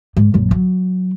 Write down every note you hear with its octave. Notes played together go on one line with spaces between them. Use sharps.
G#2
A#1 F#2
F#3